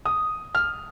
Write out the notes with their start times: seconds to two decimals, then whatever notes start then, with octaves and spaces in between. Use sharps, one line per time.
0.06 D#6
0.55 F6